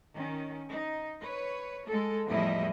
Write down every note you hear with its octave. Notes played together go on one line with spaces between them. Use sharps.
D#3 C#4
D#4
B4 C#5
G#3 A4
E2 A2 F3 G3 E4 D#5